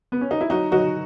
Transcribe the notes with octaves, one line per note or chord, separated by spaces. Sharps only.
B3
C#4
D#4
E4
F#3 D#4 F#4
F#3 D#4 F#4